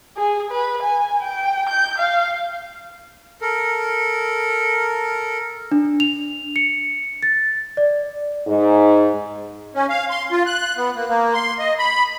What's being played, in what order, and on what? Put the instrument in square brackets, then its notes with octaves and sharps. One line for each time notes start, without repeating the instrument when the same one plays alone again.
[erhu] G#4
B4
G#5
G5
G6
F5
[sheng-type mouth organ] A4 A#4
[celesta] D4
F7
C#7
A6
D5
[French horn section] G#2
[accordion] C#4
F5
C6
F4
F#6
B3
A#3
A#3
C6
D#5
B5